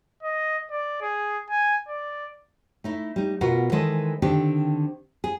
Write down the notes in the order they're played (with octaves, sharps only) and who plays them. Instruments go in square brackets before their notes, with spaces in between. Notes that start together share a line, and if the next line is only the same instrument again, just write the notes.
[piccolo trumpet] D#5
D5
G#4
G#5
D5
[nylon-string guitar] A3 D#4 E4
G3 D#4
B2 F4 F#4 A#4 B4
D#3 E3 G#3 A4 C5 D#5
D3 D#3 C4 D4 G4
G#4